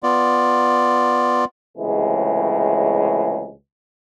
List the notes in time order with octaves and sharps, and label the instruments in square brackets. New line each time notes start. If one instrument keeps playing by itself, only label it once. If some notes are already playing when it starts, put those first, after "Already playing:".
[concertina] B3 F4 D5
[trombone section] C#2 C3 E3 F#3 G#3 A3